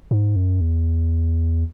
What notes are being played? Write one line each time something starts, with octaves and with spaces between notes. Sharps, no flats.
G#2
F#2
E2